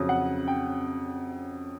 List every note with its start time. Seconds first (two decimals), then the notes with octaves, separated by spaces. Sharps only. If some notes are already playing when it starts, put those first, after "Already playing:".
Already playing: F2 C#3 F#3
0.09 F#5
0.48 G5